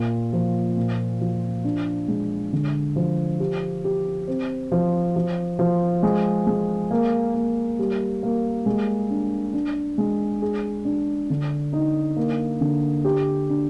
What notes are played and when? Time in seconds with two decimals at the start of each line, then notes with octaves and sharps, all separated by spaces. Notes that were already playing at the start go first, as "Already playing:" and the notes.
Already playing: A#2
0.33 F3
0.77 A#2
1.21 F3
1.64 D4
2.08 G#3
2.53 D3
2.96 F3
3.40 G4
3.84 G4
4.28 C4
4.72 F3
5.16 F3
5.59 F3
6.03 G#3
6.47 G#3
6.91 A#3
7.34 A#3
7.79 G3
8.23 A#3
8.66 G#3
9.10 D4
9.53 D4
9.98 G#3
10.42 G#4
10.85 D4
11.30 D3
11.73 D#4
12.16 A#3
12.61 D3
13.04 G4
13.49 D4